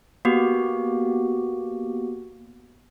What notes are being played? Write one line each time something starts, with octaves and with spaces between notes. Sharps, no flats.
A#3 B3 F#4 G4